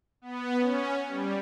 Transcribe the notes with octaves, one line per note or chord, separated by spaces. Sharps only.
B3
C#4
G3